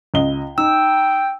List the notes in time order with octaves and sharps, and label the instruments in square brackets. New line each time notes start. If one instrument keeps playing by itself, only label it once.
[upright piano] C#2 D#5 G7
[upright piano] D#4 [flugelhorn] G5 [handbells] E6